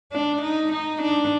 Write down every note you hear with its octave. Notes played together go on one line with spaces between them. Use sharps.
D4
D#4
D#4
D4